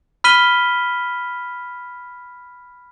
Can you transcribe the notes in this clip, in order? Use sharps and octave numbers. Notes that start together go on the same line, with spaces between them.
B5 F6 B6 D#7 G7